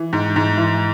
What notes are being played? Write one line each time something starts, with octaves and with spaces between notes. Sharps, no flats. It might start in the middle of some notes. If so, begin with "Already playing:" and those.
Already playing: E3
G#2
G#2
E3